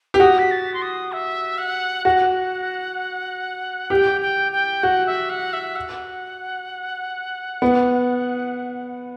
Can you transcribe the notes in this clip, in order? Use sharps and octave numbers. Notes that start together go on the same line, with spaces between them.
G4
F#4 D#6
B6
A6
C6
D#6
E5
F#5
F#4 F#5
G4 G5
G5
G5
F#4 F#5
E5
F#5
E5
F#5
B3